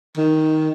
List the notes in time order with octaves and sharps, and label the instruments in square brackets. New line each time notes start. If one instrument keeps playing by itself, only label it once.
[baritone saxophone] D#3